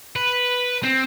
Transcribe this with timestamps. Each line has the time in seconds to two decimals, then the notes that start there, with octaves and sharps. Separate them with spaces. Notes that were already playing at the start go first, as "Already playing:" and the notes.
0.16 B4
0.83 C4